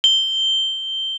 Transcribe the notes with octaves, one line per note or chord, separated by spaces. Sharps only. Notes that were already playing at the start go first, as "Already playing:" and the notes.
G7